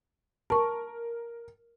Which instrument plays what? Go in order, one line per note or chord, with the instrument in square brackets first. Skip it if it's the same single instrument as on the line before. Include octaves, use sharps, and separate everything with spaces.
[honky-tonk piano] A#4 [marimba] A5 C#6